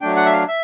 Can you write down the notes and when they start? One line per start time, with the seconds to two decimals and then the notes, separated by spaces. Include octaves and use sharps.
0.01 F#3 A3 D4 G5
0.16 F#5
0.26 E5
0.32 F5
0.48 E5